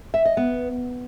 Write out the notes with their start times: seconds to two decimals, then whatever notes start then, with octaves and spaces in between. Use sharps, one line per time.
0.14 E5
0.25 D#5
0.37 B3